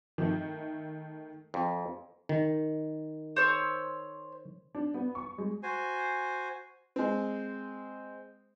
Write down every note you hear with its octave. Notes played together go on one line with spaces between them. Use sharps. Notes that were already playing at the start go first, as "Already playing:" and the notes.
D#3 A3
F2
D#3
C5 C#5 E6
D4
B3
C#6
G#3
F#4 C5 G#5
G#3 C4